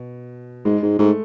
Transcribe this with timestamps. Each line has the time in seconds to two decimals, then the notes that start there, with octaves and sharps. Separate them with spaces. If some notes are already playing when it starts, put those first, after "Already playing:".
Already playing: B2
0.65 G#2 G#3
0.83 G#2
0.99 G#2 A3